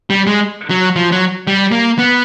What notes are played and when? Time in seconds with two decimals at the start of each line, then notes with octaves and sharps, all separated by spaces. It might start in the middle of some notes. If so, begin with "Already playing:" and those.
0.10 G3
0.27 G#3
0.70 F#3
0.96 F3
1.12 F#3
1.47 G3
1.72 A#3
1.98 B3